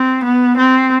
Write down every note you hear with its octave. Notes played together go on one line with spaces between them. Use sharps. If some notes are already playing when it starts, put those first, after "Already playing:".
Already playing: C4
B3
C4